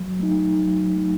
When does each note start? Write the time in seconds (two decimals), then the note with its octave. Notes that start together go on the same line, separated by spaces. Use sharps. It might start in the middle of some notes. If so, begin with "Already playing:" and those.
Already playing: F#3
0.19 A3 D#4
0.58 F#3
0.96 A3 D#4